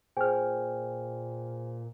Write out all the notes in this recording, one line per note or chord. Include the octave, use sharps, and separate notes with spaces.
A#2 G#4 C5 G5 G#5 F6